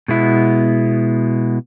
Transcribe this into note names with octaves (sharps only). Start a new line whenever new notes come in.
B2 G#3 B3 E4